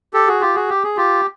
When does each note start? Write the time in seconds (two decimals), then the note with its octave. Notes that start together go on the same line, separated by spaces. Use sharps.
0.13 G4 A4
0.27 F#4 G#4
0.41 F4 G4
0.55 F#4 G#4
0.69 G4
0.83 G#4
0.97 F4 G4